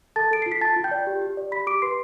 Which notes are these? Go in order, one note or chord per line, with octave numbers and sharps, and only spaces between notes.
A4 A5 A6
A4 D7
F4 C7
B6
F4 A5 A6
F4
G5 G6
D5
G4
G4
D5
G4 B5 B6
G4 D6 D7
B4 C6 C7